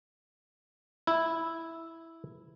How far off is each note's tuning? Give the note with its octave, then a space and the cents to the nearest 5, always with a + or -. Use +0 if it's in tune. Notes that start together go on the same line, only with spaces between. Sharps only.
E4 -5